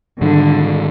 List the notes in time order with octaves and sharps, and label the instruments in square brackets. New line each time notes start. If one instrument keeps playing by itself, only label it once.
[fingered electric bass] G#2 D#3 G3 [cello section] D3